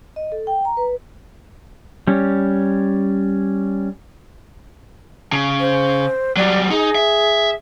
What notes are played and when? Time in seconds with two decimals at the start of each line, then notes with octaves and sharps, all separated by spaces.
0.16 D#5
0.32 A4
0.47 G5
0.65 A#5
0.77 B4
2.07 G3 C#4
5.32 C#3
5.60 C5
6.37 F#3 G3 D5
6.70 D#4 G#4
6.95 E5